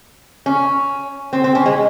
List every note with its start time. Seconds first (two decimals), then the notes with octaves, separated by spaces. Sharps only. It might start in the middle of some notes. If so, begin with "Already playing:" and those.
0.46 C#4
1.33 C4
1.44 C4
1.55 C#4
1.66 G#3